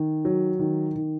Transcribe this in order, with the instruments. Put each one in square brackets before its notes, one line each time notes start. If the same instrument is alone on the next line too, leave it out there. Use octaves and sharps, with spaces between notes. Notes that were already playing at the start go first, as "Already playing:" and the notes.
Already playing: [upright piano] D#3
F#3
D#3
D#3